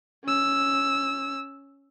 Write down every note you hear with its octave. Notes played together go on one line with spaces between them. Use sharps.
C#4 E6